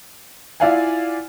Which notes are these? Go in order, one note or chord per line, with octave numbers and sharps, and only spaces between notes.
E4 F4 D5 F5 F#5 G#5